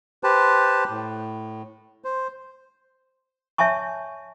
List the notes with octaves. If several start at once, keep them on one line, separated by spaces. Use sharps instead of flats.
G4 B4 C5 A5
A2
C5
C#5 E5 G#5 A5 C#6